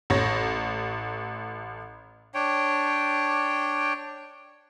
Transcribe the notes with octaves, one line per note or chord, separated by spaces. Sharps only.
A1 C#5 A#6
D4 C#5 G5